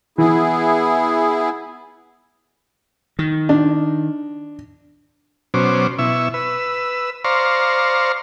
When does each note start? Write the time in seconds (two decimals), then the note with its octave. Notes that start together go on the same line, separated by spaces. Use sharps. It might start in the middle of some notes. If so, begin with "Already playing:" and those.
0.18 E3 B3 E4 G#4
3.19 D#3
3.49 D4
5.54 B2 F#3 C#4 C5 D6
5.99 B2 E4 E5 C#6
6.34 B4 E6
7.24 C5 D5 F5 A#5 C6 C#6